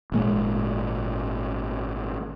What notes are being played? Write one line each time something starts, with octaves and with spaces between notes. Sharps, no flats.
G#1 A#2 G#3